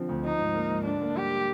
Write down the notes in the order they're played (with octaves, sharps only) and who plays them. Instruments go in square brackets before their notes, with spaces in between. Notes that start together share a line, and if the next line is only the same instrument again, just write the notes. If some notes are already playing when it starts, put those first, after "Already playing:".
Already playing: [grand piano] D3 F3 C4
D2
[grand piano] F3 [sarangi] D#4
[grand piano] G#2
A#3
G#2
[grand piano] D3 [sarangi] D4
[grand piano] A#3
[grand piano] G3 [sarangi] G4